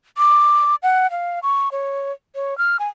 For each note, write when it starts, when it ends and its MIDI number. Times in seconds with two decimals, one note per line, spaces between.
0.18 0.75 86
0.83 1.10 78
1.11 1.39 77
1.43 1.69 85
1.72 2.12 73
2.35 2.57 73
2.58 2.77 89
2.79 2.88 80